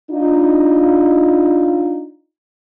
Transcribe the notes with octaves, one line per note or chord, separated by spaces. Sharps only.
D4 D#4 F4